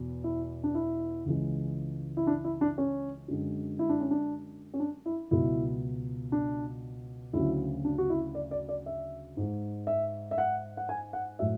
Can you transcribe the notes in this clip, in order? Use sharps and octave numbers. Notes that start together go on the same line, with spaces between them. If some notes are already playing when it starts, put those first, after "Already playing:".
Already playing: E2 B2
E4
D4
E4
C#2 C#3 E3 G#3
E4
D4
E4
D4
C#4
F#2 D3 G#3
E4
D4
C#4
D4
C#4
D4
E4
C#2 B2 F#3 E4
D4
D2 C#3 F#3 E4
D4
F#4
E4
D5
D5
D5
E5
G#2 G#3
E5
E5
F#5
F#5
G#5
F#5
A2 F#3 E5